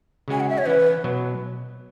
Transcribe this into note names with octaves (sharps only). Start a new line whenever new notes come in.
C#3 G#3 C#4 F#4 G#5
F#5
E5
C#5
E3 C#4 E4 B4
B2 F#3 B3